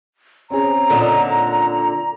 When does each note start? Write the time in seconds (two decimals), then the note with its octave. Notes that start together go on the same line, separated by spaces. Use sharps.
0.50 C4 C#4 G#4 A#5
0.90 A#2 D3 D#4